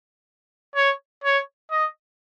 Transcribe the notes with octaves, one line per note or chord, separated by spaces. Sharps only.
C#5
C#5
D#5